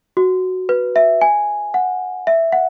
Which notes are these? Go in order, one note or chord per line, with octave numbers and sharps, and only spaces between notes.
F#4
B4
E5
G#5
F#5
E5
F#5